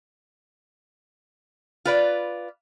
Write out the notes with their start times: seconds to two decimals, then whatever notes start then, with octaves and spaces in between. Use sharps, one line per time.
1.85 F4 B4 D5